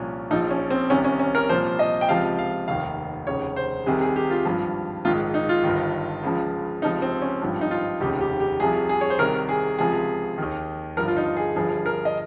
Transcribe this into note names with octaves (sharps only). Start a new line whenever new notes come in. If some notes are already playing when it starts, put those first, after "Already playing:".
Already playing: C2 A#2 F3 C#4
A#1 A#2 F3 D#4
C#4
C4
C2 C3 D#3 C#4
C#4
C#4
A#4
C2 A#2 F3 C5
D#5
G5
C#2 C3 F3 F5
F5
F1 D#2 D#3 F5
F1 D#2 C#3 C#5
C5
C2 C3 D#3 G#4
G#4
G4
F4
G#1 G2 F3
A#1 G#2 D#3 F4
D#4
F4
G1 G2 D#3
C#2 C#3 F3
C#2 C3 F3 D#4
C4
C#4
G#1 G2 F3
D#4
F4
F1 D#2 C#3 G4
G4
G4
C2 C3 F3 G#4
G#4
C#5
C5
C2 C3 D#3 A#4
G#4
C#2 C3 F3 G#4
D#2 D#3
G1 G2 F3 A#4
F4
D#4
G#4
G1 G2 F3 G#4
A#4
D#5